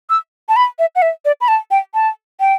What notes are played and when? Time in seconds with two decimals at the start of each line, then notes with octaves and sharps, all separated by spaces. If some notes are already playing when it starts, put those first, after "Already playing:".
0.10 E6
0.49 A5
0.56 B5
0.79 E5
0.95 F#5
1.02 E5
1.25 D5
1.41 B5
1.48 A5
1.71 G5
1.94 A5
2.40 G5